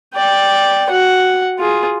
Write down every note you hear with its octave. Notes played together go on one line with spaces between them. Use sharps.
D5 G5
F#4 F#5
F4 G#4